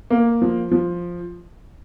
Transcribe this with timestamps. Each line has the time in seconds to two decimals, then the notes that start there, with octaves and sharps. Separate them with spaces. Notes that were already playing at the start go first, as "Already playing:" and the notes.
0.11 A#3
0.42 F3
0.71 F3